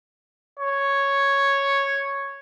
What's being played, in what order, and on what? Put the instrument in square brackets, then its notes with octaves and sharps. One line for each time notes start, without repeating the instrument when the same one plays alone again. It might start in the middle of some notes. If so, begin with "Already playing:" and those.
[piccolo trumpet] C#5